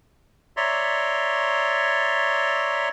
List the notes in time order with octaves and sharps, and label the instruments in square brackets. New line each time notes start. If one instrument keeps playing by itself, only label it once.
[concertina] C#5 D5 E5 A#5 C6